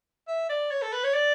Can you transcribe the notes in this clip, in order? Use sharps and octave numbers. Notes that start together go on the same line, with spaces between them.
E5
D5
C#5
A4
B4
C#5
D5